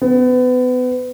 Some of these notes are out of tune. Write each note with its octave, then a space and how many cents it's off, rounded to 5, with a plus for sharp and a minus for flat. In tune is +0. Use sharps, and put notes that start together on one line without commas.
B3 +30